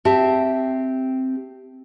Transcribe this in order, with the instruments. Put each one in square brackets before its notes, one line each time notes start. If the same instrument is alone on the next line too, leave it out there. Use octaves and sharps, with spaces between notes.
[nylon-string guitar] C4 G4 E5 A5